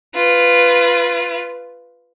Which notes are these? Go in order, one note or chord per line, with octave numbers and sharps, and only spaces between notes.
F4 B4